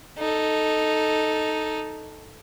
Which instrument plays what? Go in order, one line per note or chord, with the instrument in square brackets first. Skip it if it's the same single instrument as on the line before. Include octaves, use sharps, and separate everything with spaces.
[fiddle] D#4 A4